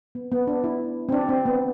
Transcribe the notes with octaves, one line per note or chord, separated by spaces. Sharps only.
B3
B3
D4
E4
C4
D4
C4
B3